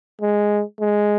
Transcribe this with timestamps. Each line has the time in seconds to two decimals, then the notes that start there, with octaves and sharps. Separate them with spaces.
0.22 G#3
0.81 G#3